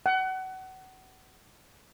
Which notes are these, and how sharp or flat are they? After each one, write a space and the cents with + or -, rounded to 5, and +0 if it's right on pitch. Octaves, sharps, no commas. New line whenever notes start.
F#5 +30